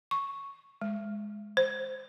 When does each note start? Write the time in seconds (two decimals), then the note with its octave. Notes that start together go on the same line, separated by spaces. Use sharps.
0.11 C#6
0.81 G#3
1.57 C5